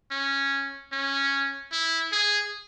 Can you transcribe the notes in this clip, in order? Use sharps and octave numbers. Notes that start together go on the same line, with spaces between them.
C#4
C#4
E4
G#4